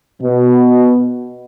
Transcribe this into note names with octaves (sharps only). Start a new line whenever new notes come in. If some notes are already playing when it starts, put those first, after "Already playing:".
B2